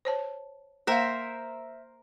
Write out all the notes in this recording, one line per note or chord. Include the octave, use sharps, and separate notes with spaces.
C5 C#5 A5
A#3 A#4 C5 E5 F5